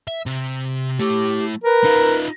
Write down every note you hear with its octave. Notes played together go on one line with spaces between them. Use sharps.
E5
C3
A3 E4 G4
A#4 B4
D#4 F4